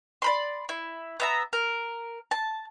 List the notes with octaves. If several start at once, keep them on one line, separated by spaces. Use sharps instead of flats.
D5 B5 C6
E4
B3 E5 A#5
A#4
A5